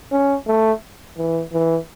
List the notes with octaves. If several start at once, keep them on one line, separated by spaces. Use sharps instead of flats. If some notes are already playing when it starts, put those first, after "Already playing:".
C#4
A3
E3
E3